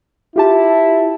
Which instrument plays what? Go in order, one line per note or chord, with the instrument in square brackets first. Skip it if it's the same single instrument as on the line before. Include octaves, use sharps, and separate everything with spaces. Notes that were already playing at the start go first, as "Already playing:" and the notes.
[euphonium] E4 [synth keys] F4 G4 A5